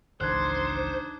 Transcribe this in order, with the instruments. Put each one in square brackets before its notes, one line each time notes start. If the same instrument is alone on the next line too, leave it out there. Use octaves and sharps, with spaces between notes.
[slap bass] G#1 C#2 E3 [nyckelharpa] D4 D#4 [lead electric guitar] C5 [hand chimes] F#6 G#6